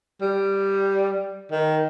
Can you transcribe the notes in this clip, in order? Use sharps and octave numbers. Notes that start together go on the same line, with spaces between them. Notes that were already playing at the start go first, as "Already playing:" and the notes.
G3
D#3